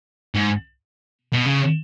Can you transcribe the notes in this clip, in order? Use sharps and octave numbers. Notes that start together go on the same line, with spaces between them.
G#2
B2
C#3